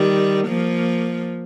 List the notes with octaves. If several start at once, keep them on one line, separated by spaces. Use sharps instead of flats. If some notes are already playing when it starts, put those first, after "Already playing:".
Already playing: D#3 G3
F3 A#3